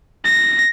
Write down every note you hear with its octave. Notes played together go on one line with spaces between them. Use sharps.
A#6